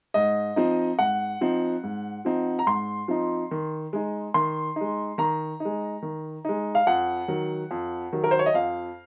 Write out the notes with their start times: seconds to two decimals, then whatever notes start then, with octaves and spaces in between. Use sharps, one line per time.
0.14 G#2 D#5
0.56 F3 C4 D#4
0.99 G#2 F#5
1.41 F3 C4 D#4
1.83 G#2
2.25 F3 C4 D#4
2.59 A#5
2.66 G#2 C6
3.08 F3 C4 D#4
3.51 D#3
3.93 G#3 D#4
4.34 D#3 C6
4.76 G#3 D#4
5.18 D#3 A#5
5.60 G#3 D#4
6.02 D#3
6.45 G#3 D#4
6.75 F5
6.87 F2 F#5
7.28 D#3 F#3
7.71 F2
8.13 D#3 F#3
8.24 A#4
8.31 C5
8.39 C#5
8.46 D#5
8.54 F2 F5